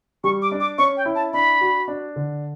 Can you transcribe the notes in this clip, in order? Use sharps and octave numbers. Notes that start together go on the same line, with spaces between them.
G3 C#6
D6
D4
D6
C#4 C#6
G5
E4
A5
D4 B5
F#4
D4
D3